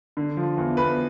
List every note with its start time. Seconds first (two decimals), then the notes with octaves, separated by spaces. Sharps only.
0.17 D3
0.37 F3
0.57 E2
0.77 E2 B4